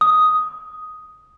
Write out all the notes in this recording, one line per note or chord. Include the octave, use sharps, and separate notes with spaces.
D#6